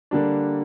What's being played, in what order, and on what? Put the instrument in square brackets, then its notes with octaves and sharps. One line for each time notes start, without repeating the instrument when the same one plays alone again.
[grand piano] D3 G3 A#3 D4